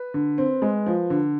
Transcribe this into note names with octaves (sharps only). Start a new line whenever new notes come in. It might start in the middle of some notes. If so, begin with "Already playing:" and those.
Already playing: B4
D3
C4
G#3
F3
D3